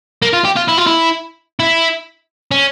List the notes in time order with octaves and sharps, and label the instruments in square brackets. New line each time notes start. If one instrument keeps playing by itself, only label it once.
[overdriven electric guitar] A#3
F4
G4
F4
E4
F4
E4
E4
C#4